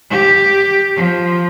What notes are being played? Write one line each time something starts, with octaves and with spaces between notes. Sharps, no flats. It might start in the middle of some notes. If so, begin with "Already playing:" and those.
G4
F3